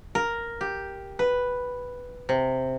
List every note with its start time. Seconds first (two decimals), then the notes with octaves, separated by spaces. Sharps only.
0.15 A#4
0.61 G4
1.19 B4
2.29 C3